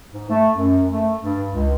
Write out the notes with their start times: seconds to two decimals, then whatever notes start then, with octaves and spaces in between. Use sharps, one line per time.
0.12 G#2
0.30 A3
0.52 F#2
0.91 A3
1.22 G2
1.52 C#2